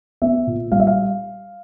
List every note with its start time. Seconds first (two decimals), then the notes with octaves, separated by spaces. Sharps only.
0.22 B3 E5
0.47 A#2
0.72 G3 F5
0.80 E5
0.87 F5